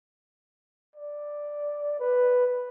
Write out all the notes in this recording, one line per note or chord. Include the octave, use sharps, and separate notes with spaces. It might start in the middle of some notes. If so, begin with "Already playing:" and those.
D5
B4